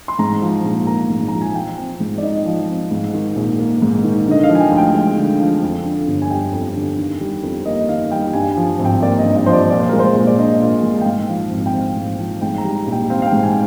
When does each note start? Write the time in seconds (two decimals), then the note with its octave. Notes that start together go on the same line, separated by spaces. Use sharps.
0.08 C6
0.19 G#2 A#5
0.42 F3
0.64 A#1
0.87 A#3 A#5
1.10 G#2
1.28 F3 A#5
1.42 G#5
1.55 F3 G5
1.78 C4
2.00 G#2
2.18 D5
2.23 D#4 D#5
2.46 F3
2.68 C4
2.91 G#2
3.14 D#3
3.36 A#1
3.59 A#3
3.82 G#2
4.04 D#3
4.27 D3 D#5
4.43 F5
4.49 F3
4.55 G#5
4.60 G5
4.71 D2
4.77 G5
4.94 G#3
5.17 D3
5.40 F3
5.63 F2
5.85 D3
6.08 G1
6.22 G#5
6.30 G3 G5
6.52 F2
6.76 D3
6.98 D#3
7.21 G3
7.43 F2
7.66 A#3 D#5
7.89 D#3 F5
8.05 F5
8.11 G3 G5
8.33 G2 G#5
8.51 G#5
8.57 F3
8.79 G#1
8.85 G5
9.02 A#3 D5
9.19 D#5
9.25 G2
9.36 D#5
9.46 F3 C5
9.53 D5
9.70 A#2 D5
9.80 C5
9.89 G#3 A#4
9.99 C5
10.15 A#1
10.27 D5
10.37 D4 D#5
10.60 A#2
10.83 G#3
11.01 G5
11.06 G#2 F5
11.28 F3
11.51 G#1
11.66 G5
11.74 C4 F5
11.96 G#2
12.19 F3
12.42 G#2 G5
12.58 A#5
12.64 G3
12.75 A#5
12.87 A#1
12.92 G5
13.10 C4 F5
13.22 F5
13.27 G5
13.32 G#2
13.43 G#5